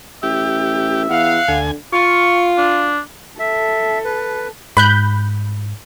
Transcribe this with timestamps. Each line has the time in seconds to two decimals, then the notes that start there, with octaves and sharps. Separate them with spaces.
0.23 A1 G4 E5
1.10 E2 F5 F#5
1.48 D2 D3 G#5
1.93 F4 C#6
2.58 D4
3.39 A4 E5
4.04 B4
4.77 G#2 B5 F#6 G6